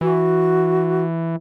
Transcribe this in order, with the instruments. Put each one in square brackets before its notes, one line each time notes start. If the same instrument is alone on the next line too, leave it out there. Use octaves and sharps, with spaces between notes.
[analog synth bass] E3 [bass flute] F#4